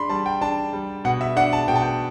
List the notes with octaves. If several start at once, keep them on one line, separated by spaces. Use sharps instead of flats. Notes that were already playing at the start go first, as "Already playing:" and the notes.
Already playing: D4 B5 C6
G3 A5
G5
D4 A5
G3
B2 F#5
E5
D4 F#5
A5
B2 G5
A5
G5